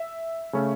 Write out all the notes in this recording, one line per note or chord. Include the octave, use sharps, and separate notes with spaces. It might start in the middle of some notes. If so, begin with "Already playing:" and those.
Already playing: E5
C#3 A3 C#4